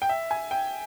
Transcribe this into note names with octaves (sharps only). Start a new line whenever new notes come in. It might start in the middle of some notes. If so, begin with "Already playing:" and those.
G5
E5
G#5
G5